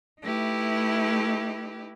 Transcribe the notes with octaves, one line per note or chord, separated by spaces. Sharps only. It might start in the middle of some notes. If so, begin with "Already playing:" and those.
A3 D#4 E4 G4 B4